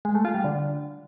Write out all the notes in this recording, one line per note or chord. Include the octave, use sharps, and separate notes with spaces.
G#3
A3
F4
G3
D3